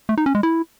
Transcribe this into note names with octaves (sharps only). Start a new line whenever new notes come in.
A3
D#4
C#4
G#3
E4